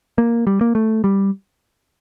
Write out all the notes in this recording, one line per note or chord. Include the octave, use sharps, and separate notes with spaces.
A#3
G3
A#3
A3
G3